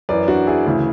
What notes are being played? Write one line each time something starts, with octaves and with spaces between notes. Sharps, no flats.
F#2 E3 B4 D5
D4 F#4
E4 G#4
D2 C#3 E3